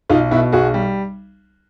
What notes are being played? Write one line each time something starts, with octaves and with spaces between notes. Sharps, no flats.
B1 D#4 F4
B2 E4 F#4
B1 F#4 G#4
G3